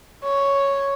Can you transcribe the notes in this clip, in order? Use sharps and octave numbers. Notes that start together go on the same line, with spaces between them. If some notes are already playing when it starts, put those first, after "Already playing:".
C#5